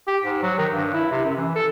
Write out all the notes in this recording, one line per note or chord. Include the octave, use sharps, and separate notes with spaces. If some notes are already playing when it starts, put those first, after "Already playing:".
G4
G#2
F#3
D#3
G2
E4
C3
F#2
E3
A4